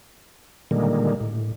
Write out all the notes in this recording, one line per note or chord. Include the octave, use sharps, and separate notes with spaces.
A#2 D3 D#3 G3 G#3 A#3
A2